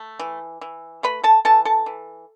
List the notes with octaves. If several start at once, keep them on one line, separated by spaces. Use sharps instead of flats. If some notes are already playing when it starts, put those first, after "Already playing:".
Already playing: A3
E3
E3
A3 B4 B5
A4 A5
E3 A4 A5
A4 A5
E3